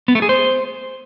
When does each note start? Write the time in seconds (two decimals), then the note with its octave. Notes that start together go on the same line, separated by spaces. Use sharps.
0.08 B3
0.15 A3
0.22 G#4
0.29 C5